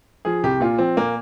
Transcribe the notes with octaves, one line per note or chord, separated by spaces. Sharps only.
F3 G#4
C2 G4
A#2 F4
F3 C4
A#2 A#3